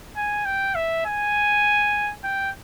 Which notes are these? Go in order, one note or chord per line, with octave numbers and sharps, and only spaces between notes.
G#5
G5
E5
G#5
G5